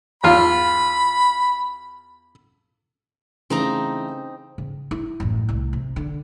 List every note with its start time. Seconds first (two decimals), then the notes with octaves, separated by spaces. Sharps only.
0.24 E2 F4 B5
3.50 C#3 E3 A3 C4 D#4 A#5
4.58 C#3
4.91 E4
5.20 A1 F#2
5.49 C2 A3
5.73 C3
5.96 D3